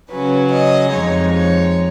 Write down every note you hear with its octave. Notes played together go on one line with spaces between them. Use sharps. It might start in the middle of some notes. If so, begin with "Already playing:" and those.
C#3 F#3 C#4 B4
D#5
F2 F3 G#3 D#4 C#5
C#5